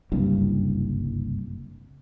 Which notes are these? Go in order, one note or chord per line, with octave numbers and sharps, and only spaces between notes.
F#1 C2 G2